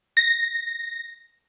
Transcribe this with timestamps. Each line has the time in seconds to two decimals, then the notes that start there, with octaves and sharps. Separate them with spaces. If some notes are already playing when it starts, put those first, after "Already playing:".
0.17 A#6